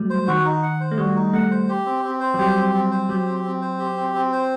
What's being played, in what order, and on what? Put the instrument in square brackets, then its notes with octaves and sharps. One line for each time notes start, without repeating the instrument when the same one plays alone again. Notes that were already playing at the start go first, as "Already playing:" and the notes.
Already playing: [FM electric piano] F#3 G3 A3
[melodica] C5
[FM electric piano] D#3 [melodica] F#4
[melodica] D#4
F#5
C5
[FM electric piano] A3
[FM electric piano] G3 [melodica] F#4
[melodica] D#4
[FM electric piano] A3 [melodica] F#5
[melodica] C5
G4
C4
C4
C5
[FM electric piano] F#3
[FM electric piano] G3 [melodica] G4
[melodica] C4
C4
C5
[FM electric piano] F#3 [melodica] G4
[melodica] C4
C4
C5
G4
C4
C4
C5